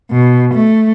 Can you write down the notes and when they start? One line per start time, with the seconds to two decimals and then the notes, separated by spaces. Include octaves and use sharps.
0.11 B2
0.54 A3